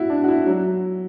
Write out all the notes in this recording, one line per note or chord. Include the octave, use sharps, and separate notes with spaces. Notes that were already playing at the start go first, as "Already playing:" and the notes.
Already playing: E4 F#4
D4
F#4
E4
F#3